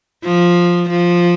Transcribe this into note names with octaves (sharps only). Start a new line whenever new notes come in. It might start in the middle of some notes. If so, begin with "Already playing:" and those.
F3
F3